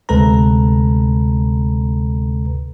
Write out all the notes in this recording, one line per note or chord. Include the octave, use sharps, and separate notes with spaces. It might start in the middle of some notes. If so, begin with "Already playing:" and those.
D2 C3 G#3 A4 B4 A#5